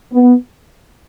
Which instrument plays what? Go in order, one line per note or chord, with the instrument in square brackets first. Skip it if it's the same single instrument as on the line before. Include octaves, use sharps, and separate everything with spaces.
[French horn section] B3